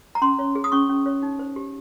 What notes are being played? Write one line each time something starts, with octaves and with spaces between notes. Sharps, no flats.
A#5
C#4 C6
C#5
G#4
D#6
C#4 C#6
C#4
C#5
D#4
C5
G4